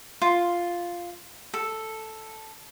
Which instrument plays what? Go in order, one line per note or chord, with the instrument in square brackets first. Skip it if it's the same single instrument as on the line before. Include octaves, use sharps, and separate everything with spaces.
[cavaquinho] F4
A4